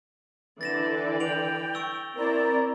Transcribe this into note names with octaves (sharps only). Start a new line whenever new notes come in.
D3 E3 D5 A6 A#6 E7
G5 D7 F7 F#7
C#6 E6 G7
C4 E4 A#4 D5 A#5